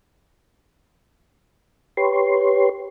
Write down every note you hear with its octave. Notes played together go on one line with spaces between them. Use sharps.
G4 B4 C#5 C6